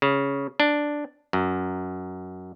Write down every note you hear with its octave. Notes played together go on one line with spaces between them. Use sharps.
C#3
D4
F#2